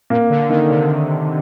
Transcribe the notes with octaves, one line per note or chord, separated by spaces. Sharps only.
A#2 A#3
D3
D#3 A#3
C3